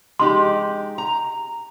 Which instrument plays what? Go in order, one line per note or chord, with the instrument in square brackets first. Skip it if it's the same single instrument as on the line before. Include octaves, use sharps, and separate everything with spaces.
[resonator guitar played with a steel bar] G#3 D#4 G4 [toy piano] C6
[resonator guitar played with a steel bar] A#5